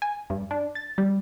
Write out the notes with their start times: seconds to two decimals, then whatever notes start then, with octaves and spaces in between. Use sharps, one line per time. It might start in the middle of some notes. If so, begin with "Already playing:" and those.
0.02 G#5
0.30 G2
0.51 D4
0.75 A6
0.98 G3